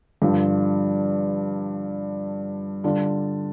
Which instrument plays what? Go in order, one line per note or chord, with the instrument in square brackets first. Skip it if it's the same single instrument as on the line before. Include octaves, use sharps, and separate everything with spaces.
[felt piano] G2 D3 F3 D4 G4
D3 G3 D4 F4